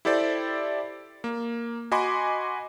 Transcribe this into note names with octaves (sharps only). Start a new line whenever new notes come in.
E4 G4 A4 C5 D5
A#3
F#4 D#5 G#5 B5 C6 D6